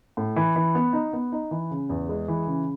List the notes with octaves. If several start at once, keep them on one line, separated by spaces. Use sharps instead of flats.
A2
E3
E3
B3
D#4
B3
D#4
E3
C#3
E2
G#3
E3
C#3